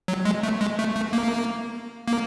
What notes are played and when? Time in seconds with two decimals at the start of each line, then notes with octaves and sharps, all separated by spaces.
0.08 F#3
0.25 G#3
0.43 A3
0.61 G#3
0.79 A3
0.96 A3
1.13 A#3
2.08 A#3